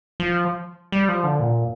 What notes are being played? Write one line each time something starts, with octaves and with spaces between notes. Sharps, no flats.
F3
G3
F3
D3
A#2